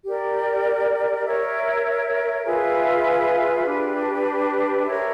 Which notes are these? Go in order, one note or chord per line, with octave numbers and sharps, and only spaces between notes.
G4 A#4 D5
A#4 C#5 E5
F4 G#4 B4 E5
D4 G4 B4
A#4 C#5 E5